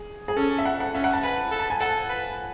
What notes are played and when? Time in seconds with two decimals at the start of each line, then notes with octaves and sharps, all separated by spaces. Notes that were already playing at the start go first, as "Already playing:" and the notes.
Already playing: G#4
0.28 G#4
0.37 C#4 A4
0.59 E5
0.65 F#5
0.80 F#5
0.94 C#4 E5
1.04 F#5
1.13 A5
1.23 B4 G#5
1.52 A4
1.59 A5
1.70 G#5
1.81 A4 F#5
2.09 B4